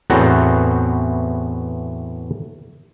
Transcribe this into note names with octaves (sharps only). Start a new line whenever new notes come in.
E2 A2 B3 C4 F#4 A#5